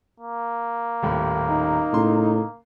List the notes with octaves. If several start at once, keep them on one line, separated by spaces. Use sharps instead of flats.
A#3
D#1 D#2 A2
D#4
A2 C#3 C6